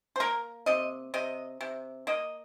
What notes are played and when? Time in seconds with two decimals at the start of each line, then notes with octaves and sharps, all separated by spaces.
0.16 C5
0.20 A#3 A#4
0.66 C3 D#5
1.14 C3 D#5
1.61 C3
2.07 A#3 D#5